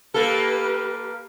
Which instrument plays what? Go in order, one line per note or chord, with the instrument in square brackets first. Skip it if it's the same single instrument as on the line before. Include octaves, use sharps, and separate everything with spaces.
[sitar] A#3 A4 [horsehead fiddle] G4 B4